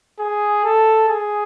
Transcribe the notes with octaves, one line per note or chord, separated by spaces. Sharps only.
G#4
A4
G#4